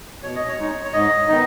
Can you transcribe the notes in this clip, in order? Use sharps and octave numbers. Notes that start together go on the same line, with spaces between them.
B2 C#5
D#5
C#5
G#3 D#4
C#5
G#2 D#5
D#3 B3 D#4